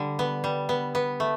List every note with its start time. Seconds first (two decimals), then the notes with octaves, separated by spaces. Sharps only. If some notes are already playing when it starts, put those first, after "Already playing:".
Already playing: D3 G3
0.19 B3
0.44 G3
0.69 B3
0.95 B3
1.20 A3